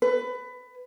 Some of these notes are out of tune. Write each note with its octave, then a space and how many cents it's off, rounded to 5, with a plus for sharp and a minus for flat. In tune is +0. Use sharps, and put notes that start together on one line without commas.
B4 +20